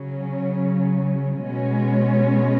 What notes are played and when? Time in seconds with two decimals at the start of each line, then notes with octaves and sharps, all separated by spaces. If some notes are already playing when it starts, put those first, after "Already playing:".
Already playing: C#3 F#3 C#4
1.44 B2 G#3 C#4